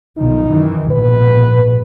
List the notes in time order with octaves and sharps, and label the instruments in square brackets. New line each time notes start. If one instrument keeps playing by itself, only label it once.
[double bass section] B1 D#3 F3 [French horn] D#4
[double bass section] F#2 D#3 E3
[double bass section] A#1 G#2 B2 [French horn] B4